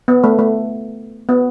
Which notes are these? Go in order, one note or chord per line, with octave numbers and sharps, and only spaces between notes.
B3
A3
A3
B3